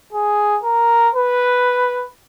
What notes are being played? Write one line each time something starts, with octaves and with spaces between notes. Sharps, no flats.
G#4
A#4
B4